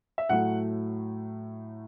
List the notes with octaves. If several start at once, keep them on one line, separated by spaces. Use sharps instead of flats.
E5
A2 F#3 A3 F#5